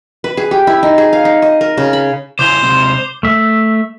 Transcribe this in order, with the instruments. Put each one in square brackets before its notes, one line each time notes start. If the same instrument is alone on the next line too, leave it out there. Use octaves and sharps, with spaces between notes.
[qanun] B4
G#4
G4
E4
D#4
G#4
F5
D#4
D#5
A#4
C#3
B5
[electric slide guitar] C#3 E4 G#5 [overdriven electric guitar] C5 [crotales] D6 G6 G7
[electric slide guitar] C3 G#3 C4
[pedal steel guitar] A3 E5